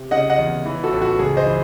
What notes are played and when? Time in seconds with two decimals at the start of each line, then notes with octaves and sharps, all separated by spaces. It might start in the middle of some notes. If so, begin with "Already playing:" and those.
Already playing: C3
0.11 C#3 D#5 F#5
0.30 D#5 F#5
0.39 E2
0.65 E3
0.84 F#4 A4
0.92 A1
1.02 F#4
1.19 C#2 G#4
1.37 C5 D#5
1.46 E3